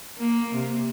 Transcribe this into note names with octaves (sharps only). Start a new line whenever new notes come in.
A#3
C3